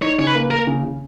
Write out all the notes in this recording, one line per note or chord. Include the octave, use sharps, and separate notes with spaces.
D#4 C#5
C#3 C#5
B4
A#3
A#3 A#4
C#3
C#3